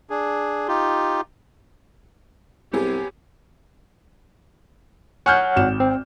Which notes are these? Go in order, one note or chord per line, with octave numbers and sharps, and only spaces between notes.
D4 G#4
D#4 F4 G4
C2 F#2 B3 G4 G#4
C#5 F#5 G#5 F6 G6
G#1 E7
C4